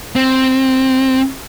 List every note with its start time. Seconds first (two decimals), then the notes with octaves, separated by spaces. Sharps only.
0.16 C4